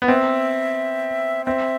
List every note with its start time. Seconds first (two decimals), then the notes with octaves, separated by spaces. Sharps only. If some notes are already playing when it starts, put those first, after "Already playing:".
0.02 B3
0.08 C4 E5
1.46 C4 E5